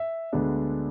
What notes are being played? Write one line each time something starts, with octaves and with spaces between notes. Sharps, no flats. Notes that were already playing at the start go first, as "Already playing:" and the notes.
Already playing: E5
D2 D3 G#3 B3 D4